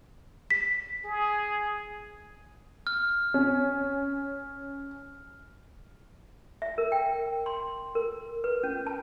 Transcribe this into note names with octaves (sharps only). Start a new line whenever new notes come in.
B6
G#4
F6
C#4
E5
A#4
G5
C6
A#4
B4
C#4
A5